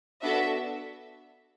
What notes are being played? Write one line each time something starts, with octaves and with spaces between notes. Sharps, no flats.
B3 D4 F#4 A4 E5